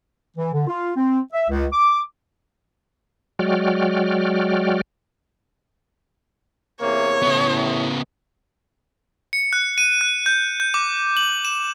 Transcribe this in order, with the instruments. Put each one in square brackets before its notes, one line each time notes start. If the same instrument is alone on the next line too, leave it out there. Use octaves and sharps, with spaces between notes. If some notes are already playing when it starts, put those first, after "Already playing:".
[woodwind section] E3
D3
F4
C4
E5
C#2
D6
[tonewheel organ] F#3 G#3 F#4 D5 G5 F6
[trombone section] E2 C3 A#3 [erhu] C#5
[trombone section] A2 [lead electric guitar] C#3 B3
[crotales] C#7
F#6
D#7
F#6
G6
G6
D6
F#7
E7